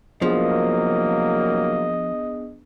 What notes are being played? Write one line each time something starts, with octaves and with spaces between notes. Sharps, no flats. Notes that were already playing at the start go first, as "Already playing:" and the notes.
C2 F3 F#3 A#3 B3 D4 G#4 D#5